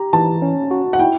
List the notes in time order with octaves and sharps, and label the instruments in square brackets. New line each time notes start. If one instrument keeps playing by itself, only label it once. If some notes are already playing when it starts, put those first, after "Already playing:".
Already playing: [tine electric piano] G4 [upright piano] A#5
[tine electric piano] E3 [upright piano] A5
[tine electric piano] C#4
F#4
[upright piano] F#5
[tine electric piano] E4 [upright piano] G5